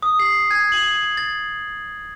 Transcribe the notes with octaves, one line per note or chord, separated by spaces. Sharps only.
D#6
C7
G#6
F#7
A6